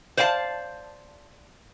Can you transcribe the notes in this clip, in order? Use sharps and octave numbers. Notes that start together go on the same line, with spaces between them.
C5 D5 F5 G#5 A5